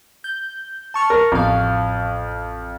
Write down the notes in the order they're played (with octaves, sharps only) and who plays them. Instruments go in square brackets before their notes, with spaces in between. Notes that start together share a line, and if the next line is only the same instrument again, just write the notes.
[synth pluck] G6
A5 C#6 F6
[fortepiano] A#4
[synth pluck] A1 F5 [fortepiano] F2